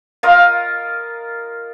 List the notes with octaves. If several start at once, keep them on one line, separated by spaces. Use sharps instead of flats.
F4 A#4 D#5